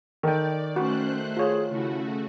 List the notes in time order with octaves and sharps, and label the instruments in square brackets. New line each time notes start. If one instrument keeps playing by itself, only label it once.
[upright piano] D#3 [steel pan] A4 G5 [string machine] D5
[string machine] A3 C5 F#6 [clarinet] C#4 [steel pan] F#4
[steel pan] F4 C#5 [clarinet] G#4
[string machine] C#3 A3 F#4 [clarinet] E4